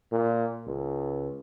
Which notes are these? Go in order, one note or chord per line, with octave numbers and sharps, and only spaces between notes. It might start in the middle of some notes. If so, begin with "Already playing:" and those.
A#2
C#2